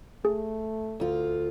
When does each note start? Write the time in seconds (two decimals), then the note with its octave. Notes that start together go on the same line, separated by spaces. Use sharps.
0.25 A3 G#4
1.00 D2 F4